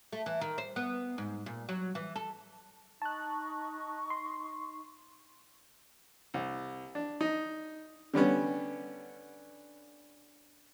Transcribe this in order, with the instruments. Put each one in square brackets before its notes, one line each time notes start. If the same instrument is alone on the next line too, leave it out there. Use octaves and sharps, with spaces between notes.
[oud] A3
E3
D#3
C5
B3
G#2
A#2
F#3
E3
A4
[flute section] D#4 C#6 [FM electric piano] A5 F#6
[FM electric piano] C6
[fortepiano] C2
D4
D#4
D3 G3 B3 C#4